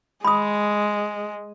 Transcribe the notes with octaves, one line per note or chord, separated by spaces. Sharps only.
G#3 B5 D#6